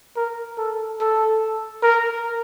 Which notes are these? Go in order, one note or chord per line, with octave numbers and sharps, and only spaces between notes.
A#4
A4
A4
A#4